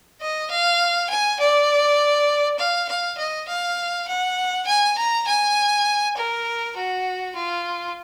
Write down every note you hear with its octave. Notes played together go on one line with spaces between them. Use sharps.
D#5
F5
G#5
D5
F5
F5
D#5
F5
F#5
G#5
A#5
G#5
A#4
F#4
F4